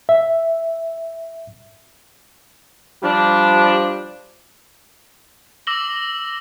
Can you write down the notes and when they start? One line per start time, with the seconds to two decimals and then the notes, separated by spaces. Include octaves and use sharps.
0.09 E5
3.03 F3 G3 D4
5.67 D6 E6 A#6 F#7 G7